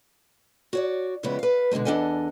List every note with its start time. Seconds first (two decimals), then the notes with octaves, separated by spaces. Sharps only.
0.73 F#4 C#5 D5
1.23 F2 C#3 G#3 B3 E4
1.39 B4 F5
1.71 B2 D3 D#3 G#3 A3
1.85 E2 D4 A4 D#5 F#5 G#5